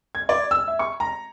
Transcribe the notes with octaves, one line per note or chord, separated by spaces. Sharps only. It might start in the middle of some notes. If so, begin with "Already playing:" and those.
G#6
D5
E6
E5
C#6
A#5